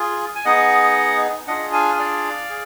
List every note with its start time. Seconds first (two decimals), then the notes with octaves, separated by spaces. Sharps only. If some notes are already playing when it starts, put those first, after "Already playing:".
Already playing: F4 G#4
0.35 G#5
0.45 B3 D#4 G#4 D#5 F#5
1.47 D4 F4 G#4 D#5 F#5
1.73 F5 G#5
1.99 D5 F5
2.50 G#4